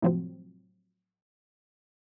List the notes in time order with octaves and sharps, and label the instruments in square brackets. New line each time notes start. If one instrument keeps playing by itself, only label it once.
[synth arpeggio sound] A2 C3 F3 F#3 C4